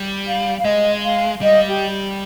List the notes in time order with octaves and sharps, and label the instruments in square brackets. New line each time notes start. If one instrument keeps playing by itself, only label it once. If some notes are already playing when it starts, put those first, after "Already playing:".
Already playing: [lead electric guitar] G3
[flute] F5
F5
[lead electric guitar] G#3 [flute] D#5
[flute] F5
[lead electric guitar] G3 [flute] D#5
[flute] G4